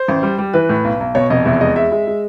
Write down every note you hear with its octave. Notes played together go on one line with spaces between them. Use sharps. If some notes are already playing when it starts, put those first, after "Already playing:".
Already playing: C5
A1
G3
G3
E3 B4
A2
B1
B1
B2 C#5
F1 D#5
E2 E5
G#3 D#5
G#3 E5
G#3
G#3